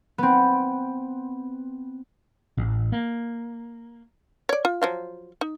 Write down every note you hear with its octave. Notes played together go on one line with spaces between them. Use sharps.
B3 C4
A1
A#3
C#5 D5
F4
F3 F#3 F5
D#4